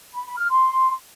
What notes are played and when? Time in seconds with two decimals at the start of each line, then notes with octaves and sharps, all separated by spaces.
0.14 B5
0.26 B5
0.37 F6
0.49 C6